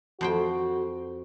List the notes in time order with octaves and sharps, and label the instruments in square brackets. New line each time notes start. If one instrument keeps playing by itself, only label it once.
[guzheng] F2 C5 G5 [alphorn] F#4